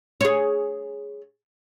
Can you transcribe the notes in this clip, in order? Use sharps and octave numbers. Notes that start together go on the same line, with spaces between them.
G#4 C#5